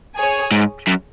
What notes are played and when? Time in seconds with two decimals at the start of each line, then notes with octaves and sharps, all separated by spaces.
0.16 G#4 C#5 G#5
0.51 G#2
0.87 F#2